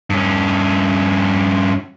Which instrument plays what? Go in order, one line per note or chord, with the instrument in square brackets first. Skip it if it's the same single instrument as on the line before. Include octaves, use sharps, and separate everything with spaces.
[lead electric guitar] G2 C#4